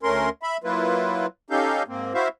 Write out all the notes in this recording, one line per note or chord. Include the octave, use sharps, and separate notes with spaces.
D2 A3 C#4 A#4 C6
E5 B5
F#3 A#3 E4 F4 B4
C#4 D#4 G4 A4 F5 G6
G#2 A#3 C4
E4 F#4 C5 E5 F5